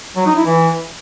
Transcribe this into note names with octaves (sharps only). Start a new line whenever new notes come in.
F#3
D#4
E4
E3